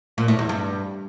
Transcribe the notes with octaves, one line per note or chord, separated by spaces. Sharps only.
A#2
A2
E2
G2